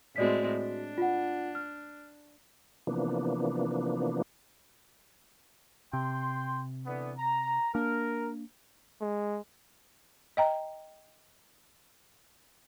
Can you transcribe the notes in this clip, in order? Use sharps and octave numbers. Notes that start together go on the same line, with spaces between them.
A2 G#3 C4 F#4 D5 B6
D4
F4 F#5
F6
C3 E3 F3 A#3 B3 D4
C3 G5 C6
D3 E3 B3
A#5
A#3 D4 A#4
G#3
D#5 G5 A#5